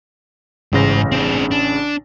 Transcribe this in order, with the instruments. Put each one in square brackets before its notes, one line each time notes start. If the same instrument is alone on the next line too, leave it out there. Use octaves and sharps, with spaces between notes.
[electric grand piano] A1 C#3 A#6 [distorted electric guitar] G#2 C5
[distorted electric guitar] C4 D4
D4